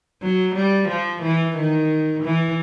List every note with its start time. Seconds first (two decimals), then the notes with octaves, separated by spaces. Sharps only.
0.22 F#3
0.55 G3
0.89 F3
1.23 E3
1.56 D#3
2.24 E3